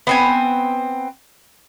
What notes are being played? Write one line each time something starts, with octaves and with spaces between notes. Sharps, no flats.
B3 C4 G#5